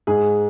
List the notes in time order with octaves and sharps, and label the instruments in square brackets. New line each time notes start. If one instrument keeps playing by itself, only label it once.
[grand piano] G#2 G#4